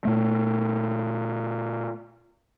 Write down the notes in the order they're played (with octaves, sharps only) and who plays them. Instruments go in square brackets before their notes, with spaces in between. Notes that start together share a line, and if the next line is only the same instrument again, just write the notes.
[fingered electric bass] A#2 A3